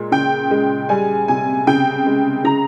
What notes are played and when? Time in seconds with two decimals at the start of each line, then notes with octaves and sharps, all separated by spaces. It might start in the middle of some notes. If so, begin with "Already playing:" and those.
Already playing: A#2 G#3
0.12 C#3 G5
0.51 G#3
0.89 G3 G#5
1.28 C3 G#5
1.67 C#3 G5
2.06 G#3
2.44 C#3 A#5